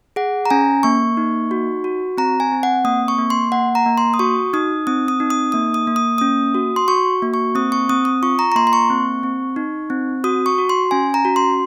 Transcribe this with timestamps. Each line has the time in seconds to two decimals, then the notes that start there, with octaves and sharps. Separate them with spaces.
0.16 G#4 F#5
0.46 A#5
0.50 C#4 G#5
0.83 A#3 C#6
1.17 D#4
1.51 F#4
1.84 F#4
2.17 C4 A#5
2.40 G#5
2.52 C4
2.63 F#5
2.85 A#3 D#6
3.08 C#6
3.18 A#3
3.30 C6
3.52 A#3 F#5
3.75 A#5
3.86 A#3
3.98 C6
4.14 D#6
4.19 F#4 C#6
4.53 D#4 D#6
4.87 C4 D#6
5.08 D#6
5.20 D#4
5.30 D#6
5.52 A#3 D#6
5.74 D#6
5.87 A#3
5.96 D#6
6.18 C#4 D#6
6.54 F#4
6.76 C6
6.88 F#4 C#6
7.22 A#3
7.34 C#6
7.55 C4 D#6
7.72 C#6
7.89 C4 D#6
8.05 D#6
8.23 F4 C#6
8.39 A#5
8.52 A#5
8.56 A#3 C6
8.67 C6
8.73 C#6
8.90 C4
9.23 C4
9.56 D#4
9.90 C4
10.24 F#4 D#6
10.46 C#6
10.58 F#4
10.69 C6
10.91 C#4 G#5
11.14 A#5
11.25 F#4
11.36 C6